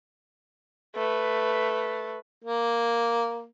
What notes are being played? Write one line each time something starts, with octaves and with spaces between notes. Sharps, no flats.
A3 B4
A#3